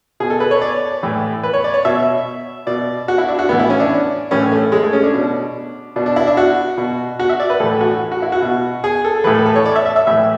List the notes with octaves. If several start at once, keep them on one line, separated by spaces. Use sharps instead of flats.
B2 G#4
A4
B4
C#5
D5
A2 E3
B4
C#5
D5
C#5
B2 E5
B2 D5
F#4
E4
D4
F#4
A2 E3 B3
E4
C#4
D4
A2 E3 C#4
A3
G#3
A3
C#4
D4
B2
B2 D4
D4
E4
D4
F#4
B2
F#4
E5
D5
B4
A2 E3 A4
F#4
F#4
E4
F#4
B2
G#4
A4
A2 E3 B4
A4
A4
C#5
D5
E5
E5
E5
A2 E3 E5